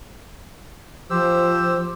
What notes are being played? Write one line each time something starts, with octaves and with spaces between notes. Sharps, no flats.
F3 G4 C5 E6